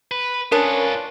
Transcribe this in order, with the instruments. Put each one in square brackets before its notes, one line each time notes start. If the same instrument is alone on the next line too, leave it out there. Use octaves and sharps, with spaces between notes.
[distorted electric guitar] B4
[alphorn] C#4 [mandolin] D4 B4 [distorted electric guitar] F4 C#5 [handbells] A#4